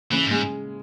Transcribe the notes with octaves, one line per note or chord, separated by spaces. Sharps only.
C#3 E3
G#2
G#3